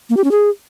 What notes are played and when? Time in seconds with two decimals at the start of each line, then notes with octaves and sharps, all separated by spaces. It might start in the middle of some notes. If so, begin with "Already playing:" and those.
0.10 A#3
0.17 G4
0.24 C#4
0.31 G#4